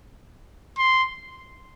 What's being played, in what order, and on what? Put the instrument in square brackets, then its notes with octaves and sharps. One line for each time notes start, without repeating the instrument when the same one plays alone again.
[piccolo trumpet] C6